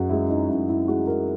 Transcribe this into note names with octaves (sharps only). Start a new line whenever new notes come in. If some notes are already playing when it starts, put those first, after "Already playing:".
Already playing: F#2 F#4 G#4
E3 G#3 E4
D#4
F#2 E4
E4
E3 G#3 F#4
A#4